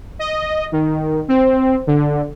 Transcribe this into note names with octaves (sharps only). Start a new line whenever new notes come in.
D#5
D#3
C4
D3